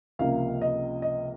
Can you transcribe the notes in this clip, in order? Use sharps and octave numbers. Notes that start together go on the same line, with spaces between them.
C#2 C3 F3 A#3 F5
D#5
D#5